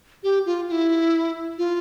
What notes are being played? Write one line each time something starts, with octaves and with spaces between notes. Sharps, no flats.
G4
F4
F4
E4
F4